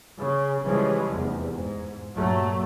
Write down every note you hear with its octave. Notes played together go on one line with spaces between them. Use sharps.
C#3
C#3 E3 F3 G3 G#3
F1 E2
G#2
G2 A#2 F#3 A3